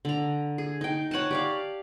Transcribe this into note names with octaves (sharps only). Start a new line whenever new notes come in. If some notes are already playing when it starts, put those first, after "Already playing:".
D3 A#5
G#4
D#4 G5
C#5 F#5 G#5 A5
G4 D5 F5